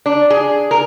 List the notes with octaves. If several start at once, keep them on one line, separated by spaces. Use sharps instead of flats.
D4
G#4
A#4